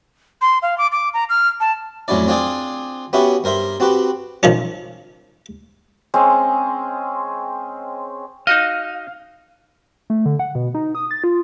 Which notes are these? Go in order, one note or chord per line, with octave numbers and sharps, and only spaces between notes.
C6
F5
D6
D6
A#5
F6
A5
F2 A2 F#3 C#4 E4 D5
C4 D4 F4 G#4 C5 D5
B3 C#4 E4 F#4 G4 E5
G2 A#4 C5 E5 C6
C4 F#4 G4 B4
D#3 F3 C#4
G#3 C4 C#4
D#4 F#4 D#5 F5
A3
D3
F#5
B2
D#4
D#6
A6
F4